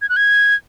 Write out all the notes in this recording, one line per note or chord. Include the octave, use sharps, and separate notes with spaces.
G#6
F#6
G#6